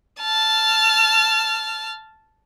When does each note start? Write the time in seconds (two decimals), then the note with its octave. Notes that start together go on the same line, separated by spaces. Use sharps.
0.20 A5 F6